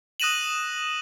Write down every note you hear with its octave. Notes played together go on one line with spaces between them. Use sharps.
D#6 F#6 A#6 D#7 E7 F#7